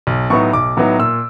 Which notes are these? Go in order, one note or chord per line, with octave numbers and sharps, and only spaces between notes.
B1
A2 F#3 B3 D#4 C#6
B1 D6
A2 F#3 B3 D#4
A#2 E6